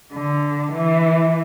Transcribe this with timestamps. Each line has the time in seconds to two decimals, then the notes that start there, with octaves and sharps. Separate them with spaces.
0.13 D3
0.72 E3